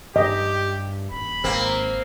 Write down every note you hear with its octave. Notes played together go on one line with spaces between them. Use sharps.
G2 G4 D#5
D#1 B5
G#1 A#3 C4